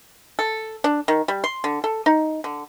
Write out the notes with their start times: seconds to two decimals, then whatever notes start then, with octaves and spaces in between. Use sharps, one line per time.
0.39 A4
0.84 D4
1.08 D#3
1.28 G3
1.44 C6
1.64 D3
1.84 A4
2.06 D#4
2.44 D3